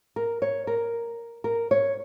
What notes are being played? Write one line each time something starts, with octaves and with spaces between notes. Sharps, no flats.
A#4
C#5
A#4
A#4
C#5